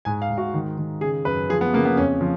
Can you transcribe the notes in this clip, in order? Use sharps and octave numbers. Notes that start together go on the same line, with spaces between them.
G#2 G#5
F5
G#2
F#4
D#3
D#3
C#3 G#4
F#2 B4
F3 G#4
B3
C#3 A#3
B3
F2 C#4
F3